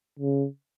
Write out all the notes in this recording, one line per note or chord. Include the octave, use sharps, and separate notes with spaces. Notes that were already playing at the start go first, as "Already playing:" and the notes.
C#3